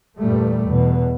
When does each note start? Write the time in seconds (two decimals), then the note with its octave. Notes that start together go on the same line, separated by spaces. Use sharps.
0.18 E2 G2 A#2 G3 A3
0.67 E2 B2